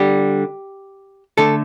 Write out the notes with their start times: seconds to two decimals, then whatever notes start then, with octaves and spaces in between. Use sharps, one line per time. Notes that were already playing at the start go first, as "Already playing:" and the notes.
Already playing: D3 G3 G4
1.37 D3 A3 A4